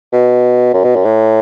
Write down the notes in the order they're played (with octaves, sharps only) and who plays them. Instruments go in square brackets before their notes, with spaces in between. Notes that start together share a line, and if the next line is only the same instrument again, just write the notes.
[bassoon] B2
F#2
B2
F#2
A2